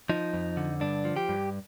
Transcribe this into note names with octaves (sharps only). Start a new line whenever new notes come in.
F3 D#4
F2
D3
G2 D4
F3
G4
G2